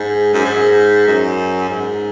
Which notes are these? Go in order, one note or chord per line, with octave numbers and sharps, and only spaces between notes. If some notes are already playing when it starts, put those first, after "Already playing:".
Already playing: G#2
F#2
G#2
F#2
G#2